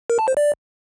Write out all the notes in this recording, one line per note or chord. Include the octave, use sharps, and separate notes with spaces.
A#4
A5
C5
D5